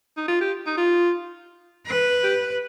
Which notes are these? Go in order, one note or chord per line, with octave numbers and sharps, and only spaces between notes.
D#4
F4
G4
D#4
F4
B4
G4